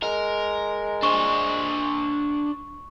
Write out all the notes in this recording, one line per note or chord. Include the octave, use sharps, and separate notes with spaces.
G#3 A#4
D4 C5 C#6